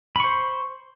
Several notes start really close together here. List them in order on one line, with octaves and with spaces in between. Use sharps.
B5 C#6 C5